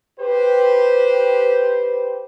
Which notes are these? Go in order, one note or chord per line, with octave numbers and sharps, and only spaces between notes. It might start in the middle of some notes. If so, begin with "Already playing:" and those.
G4 B4 C5